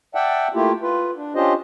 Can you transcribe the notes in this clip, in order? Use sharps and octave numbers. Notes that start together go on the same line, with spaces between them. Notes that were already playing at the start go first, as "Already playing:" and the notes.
D5 E5 F#5 G5 A5
A3 A#3 E4 F4 G4
F4 B4
D4
C#4 D4 F4 G4 C5 D#5